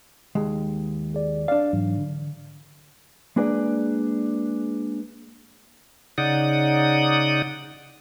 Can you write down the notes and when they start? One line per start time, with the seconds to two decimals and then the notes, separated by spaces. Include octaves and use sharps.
0.35 D#2 G#3
1.14 G#4 D5
1.48 D4 D5 F5
1.73 G#2 E3 F#3
1.98 D3
3.36 G#3 A#3 D4 G#4 B4 D5
6.18 C#3 D#4 D5 F#5 D#6